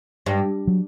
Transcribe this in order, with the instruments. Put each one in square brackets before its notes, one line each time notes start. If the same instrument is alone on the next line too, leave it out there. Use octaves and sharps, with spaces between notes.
[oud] G2
[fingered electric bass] F#3